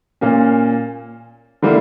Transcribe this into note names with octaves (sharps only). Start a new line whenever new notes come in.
A#2 A#3 C#4
D3 G3 A#3 E4